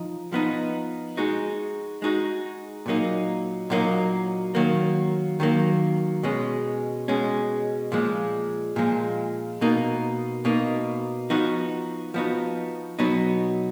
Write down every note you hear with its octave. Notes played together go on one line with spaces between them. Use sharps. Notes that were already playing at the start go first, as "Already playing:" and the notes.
Already playing: F3 D#4
F3 B3 D#4
G#3 D#4 F#4
G#3 D#4 F#4
A#2 F#3 A#3 D#4
A#2 F#3 A#3 D#4
D#3 F#3 A#3
D#3 F#3 A#3
B2 G#3 C#4
B2 G#3 C#4
A#2 F3 G#3
A#2 F3 G#3
B2 A#3 D#4
B2 A#3 D#4
F3 B3 D#4 F#4
F3 B3 D#4 F#4
B2 F#3 B3 D#4